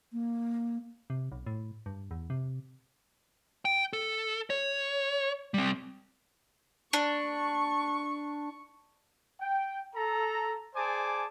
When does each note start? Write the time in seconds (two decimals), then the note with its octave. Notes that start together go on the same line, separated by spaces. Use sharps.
0.13 A#3
1.10 C3
1.32 B1
1.46 A2
1.86 G2
2.11 E2
2.30 C3
3.65 G5
3.93 A4
4.50 C#5
5.54 G3 C4
6.93 D4 C#6
9.41 G5
9.95 A4 A#5
10.75 G#4 C5 D5 G#5 A5 D6